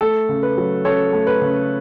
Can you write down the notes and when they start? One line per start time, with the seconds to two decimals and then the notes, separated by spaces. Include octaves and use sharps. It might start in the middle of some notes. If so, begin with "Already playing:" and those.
0.01 A3 A4
0.29 C#3
0.43 B4
0.57 F#3
0.85 C#3 A4 C#5
1.13 A3
1.27 B4
1.41 C#3